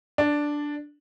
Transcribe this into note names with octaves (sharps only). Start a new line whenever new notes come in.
D4